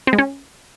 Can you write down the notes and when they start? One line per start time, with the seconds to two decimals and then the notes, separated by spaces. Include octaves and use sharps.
0.07 C4
0.13 G#3
0.18 C#4